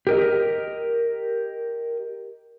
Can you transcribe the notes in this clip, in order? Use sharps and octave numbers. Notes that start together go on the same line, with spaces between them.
G4 A#4 D#5